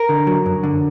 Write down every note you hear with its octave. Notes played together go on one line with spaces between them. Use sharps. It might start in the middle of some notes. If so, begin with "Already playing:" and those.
Already playing: A#4
D3
F#3
F#2
D3